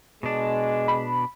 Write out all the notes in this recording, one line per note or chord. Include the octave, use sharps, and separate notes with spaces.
B2 G#3 D4
B5